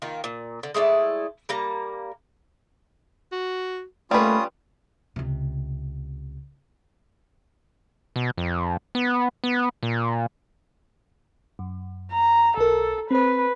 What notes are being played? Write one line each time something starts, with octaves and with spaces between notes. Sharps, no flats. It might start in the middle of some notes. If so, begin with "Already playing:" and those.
D#3 A#3 F4
A#2
D3
G#3 A3 E4 D5
G3 A#3 A#5
F#4
G3 A3 A#3 C#4 F4 B4 D#6
C#2 C3
B2
F2
B3
B3
A#2
F#2
A#5
B1 A4 A#4
C4 B4 C5